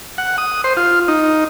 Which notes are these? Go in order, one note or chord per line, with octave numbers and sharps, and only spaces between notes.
F#5
D#6
C5
F4
D#4